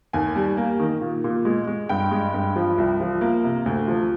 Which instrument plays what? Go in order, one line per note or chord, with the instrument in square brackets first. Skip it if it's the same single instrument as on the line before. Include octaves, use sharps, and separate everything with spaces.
[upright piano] D#2 G#5
G3
A#3
D#3
A#2
A#2
G#3
G#3
G2 G5
G#3
G2
F3
C2
F3
A#3
C3
D2
F3